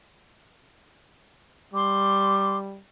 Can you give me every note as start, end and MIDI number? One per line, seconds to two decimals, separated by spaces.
1.74 2.80 55
1.74 2.55 84
1.74 2.55 86